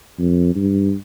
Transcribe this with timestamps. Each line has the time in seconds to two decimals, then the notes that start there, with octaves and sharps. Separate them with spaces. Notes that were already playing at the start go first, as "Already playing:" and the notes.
0.19 F2
0.55 G2